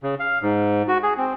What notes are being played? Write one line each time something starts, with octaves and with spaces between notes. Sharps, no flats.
C#3
F5
G#2
F#4
G#4
C4